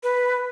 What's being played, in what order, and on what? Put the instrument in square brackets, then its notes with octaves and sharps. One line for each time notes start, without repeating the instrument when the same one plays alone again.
[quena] B4